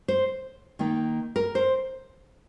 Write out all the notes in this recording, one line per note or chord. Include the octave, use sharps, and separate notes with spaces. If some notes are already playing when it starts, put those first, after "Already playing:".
C5
D#3 A#3 D#4
A#4
C5